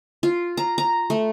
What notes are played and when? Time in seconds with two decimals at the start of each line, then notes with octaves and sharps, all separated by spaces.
0.23 F4
0.57 A#5
0.78 A#5
1.10 A3